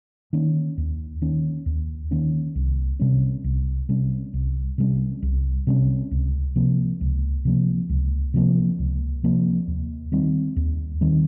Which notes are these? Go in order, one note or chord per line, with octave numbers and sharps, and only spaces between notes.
D#3 A#3 C#4
D#2
D#3 A#3 C#4
D#2
D#3 A#3 C#4
C2
C3 G3 C#4
C2
C3 G3 C#4
C2
C3 G3 C#4
C2
C3 G3 C#4
C#2
C3 F3 A#3
C#2
C3 F3 A#3
C#2
C3 F3 A#3
C#2
C3 F3 A#3
D#2
D#3 G3 C4
D#2
D#3 G3 C4